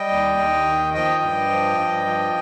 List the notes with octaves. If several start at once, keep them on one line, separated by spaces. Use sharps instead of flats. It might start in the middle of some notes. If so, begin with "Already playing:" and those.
Already playing: G3 D#5 G5
D#2
D#2
D#3
F3 D#5 G5
G2
F3
G2
F3